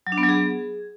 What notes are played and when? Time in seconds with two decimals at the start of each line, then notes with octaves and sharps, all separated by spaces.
0.07 F#3
0.12 D4
0.18 B3
0.23 F#3
0.29 G#4